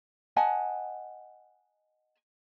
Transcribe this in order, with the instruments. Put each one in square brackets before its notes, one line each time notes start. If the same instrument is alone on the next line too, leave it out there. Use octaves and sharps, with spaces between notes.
[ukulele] D#5 F#5 G#5 A5